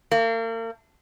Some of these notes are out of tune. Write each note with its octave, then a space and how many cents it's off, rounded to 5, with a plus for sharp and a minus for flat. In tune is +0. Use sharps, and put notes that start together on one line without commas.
A#3 -40